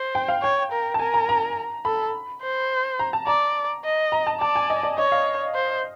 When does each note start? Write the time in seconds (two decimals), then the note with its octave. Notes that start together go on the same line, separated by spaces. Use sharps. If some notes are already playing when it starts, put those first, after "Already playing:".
Already playing: C5
0.15 G5
0.28 F5
0.43 C#5 G5
0.72 A#4
0.94 A5
0.99 A#4 G#5
1.14 A#5
1.29 A#5
1.85 A4 B5
2.42 C5
2.99 A#5
3.13 A5
3.27 D5 A#5
3.84 D#5
4.12 A#5
4.27 A5
4.40 D5 A5
4.56 G#5
4.70 D#5
4.83 D5
4.98 C#5 D#5
5.12 F5
5.55 C5